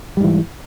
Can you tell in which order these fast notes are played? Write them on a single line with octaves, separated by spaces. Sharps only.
G3 G#2 E3